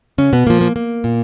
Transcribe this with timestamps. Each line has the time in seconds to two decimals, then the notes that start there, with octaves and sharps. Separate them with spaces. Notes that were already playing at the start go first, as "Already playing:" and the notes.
0.18 C#3 C#4
0.33 B2 B3
0.46 A#2 F3 A#3
0.61 A#3
0.76 A#3
1.04 A#2